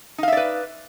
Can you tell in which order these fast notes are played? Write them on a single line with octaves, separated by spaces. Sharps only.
D#4 F5 E5 D5 B4